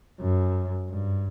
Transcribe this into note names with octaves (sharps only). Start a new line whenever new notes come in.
F#2
G2